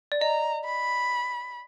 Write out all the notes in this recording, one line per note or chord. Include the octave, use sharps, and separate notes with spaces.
D5
D#5 A#5
B5